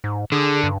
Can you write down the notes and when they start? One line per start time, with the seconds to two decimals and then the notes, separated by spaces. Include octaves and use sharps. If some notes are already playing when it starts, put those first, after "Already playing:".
0.04 G#2
0.32 D3 G#4
0.63 G2